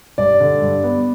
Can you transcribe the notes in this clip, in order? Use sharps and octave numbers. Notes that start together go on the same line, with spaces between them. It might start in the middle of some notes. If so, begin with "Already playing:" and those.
G2 D5
D3
G2
B3